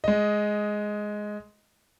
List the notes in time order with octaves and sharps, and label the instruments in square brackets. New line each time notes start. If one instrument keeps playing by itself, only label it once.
[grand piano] G#3 D#5